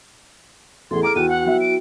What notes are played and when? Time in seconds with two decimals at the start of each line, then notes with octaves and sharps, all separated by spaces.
0.91 A1 E2 G#4 A4 C6
1.03 A#5 D6 F6 D7
1.16 E2 E4 F#4 G5 D#7
1.29 F#5
1.46 F#3 B3 E5
1.60 D7